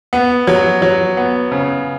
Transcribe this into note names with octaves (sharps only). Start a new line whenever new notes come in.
B3
F#3
F#3
B3
C#3